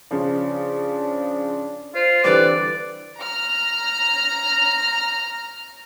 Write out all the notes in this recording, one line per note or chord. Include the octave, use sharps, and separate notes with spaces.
C#3 F3 D4
F4 C5
D3 E3 G3 C4 B4 D5
A#5 F6